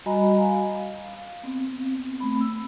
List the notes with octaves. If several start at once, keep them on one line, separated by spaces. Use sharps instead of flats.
G3 F#4 D#5 G#5 A#5 B5
F5
B3 C4
A3 C4 B5
E6